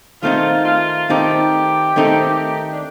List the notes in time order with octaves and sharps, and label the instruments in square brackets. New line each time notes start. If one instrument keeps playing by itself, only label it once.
[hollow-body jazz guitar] D#3 A3 C4 D#4 A4 [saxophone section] F4
[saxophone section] F4
[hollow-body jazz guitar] D#3 A3 C4 D#4 A4 [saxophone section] G4
[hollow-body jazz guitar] D#3 A3 C4 D#4 A4
[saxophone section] D4